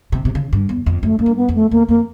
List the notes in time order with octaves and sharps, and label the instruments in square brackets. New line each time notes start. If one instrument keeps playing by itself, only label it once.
[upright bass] C3
C3
C#3
G2
E2
F2
[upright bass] F#2 [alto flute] A3
[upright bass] F#2 [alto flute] A#3
[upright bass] G2
[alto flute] B3
[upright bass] F2
[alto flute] A3
[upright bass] E2 [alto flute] A#3
[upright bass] F2 [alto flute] A#3